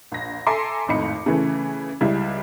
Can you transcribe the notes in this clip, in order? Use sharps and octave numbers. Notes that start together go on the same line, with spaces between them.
A#1 A#6
A4 E5 G#5 A#5 C6 D6
G#1 F2 A2 D#4 B5 C#7
C#3 E3 A3
C#2 G3 E4